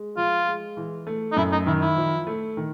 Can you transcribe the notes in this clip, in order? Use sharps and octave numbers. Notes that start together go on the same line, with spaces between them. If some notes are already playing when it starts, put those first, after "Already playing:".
Already playing: G#3
F3 F4
G#3
E3
A3
D#4
F#2 E4
D#4
D#3 E4
E4
F3
A3
D#3